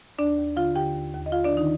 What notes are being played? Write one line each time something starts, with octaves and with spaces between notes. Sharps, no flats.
D#2 D4 D5
D#2
D3 F4 F5
D3 G4 G5
D#2
D#2
D#5
D#2 F4 F5
D4 D5
D3
D#3 D#4